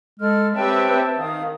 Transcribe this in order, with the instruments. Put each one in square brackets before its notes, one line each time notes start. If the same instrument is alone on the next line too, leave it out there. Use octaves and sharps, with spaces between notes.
[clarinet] G#3 [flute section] A4 F6
[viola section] C4 B4 E5 [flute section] G4 C#5 G5 [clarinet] A5
[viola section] D#3 [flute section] F5 D#6